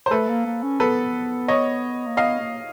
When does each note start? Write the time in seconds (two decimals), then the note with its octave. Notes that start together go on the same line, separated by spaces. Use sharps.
0.06 C5
0.11 A3 A4 B4
0.28 A#3
0.46 A#3
0.63 C#4
0.80 B3 A4 B4
1.48 C#5 D#5
2.07 A#3
2.17 B3 D#5 F5
2.40 A#3